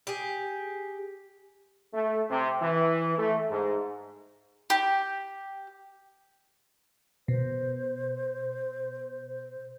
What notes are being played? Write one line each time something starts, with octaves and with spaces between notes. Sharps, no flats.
G4 G#4
A3
C3
E3
A3
G#2
G4
B2 C5